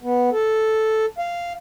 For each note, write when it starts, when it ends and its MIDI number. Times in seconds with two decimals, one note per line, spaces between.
0.03 0.30 59
0.32 1.05 69
1.18 1.53 77